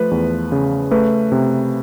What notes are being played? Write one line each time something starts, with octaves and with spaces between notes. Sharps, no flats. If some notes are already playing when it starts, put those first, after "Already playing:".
Already playing: F3 A3 B4
E2
C#3
A3 B4
C3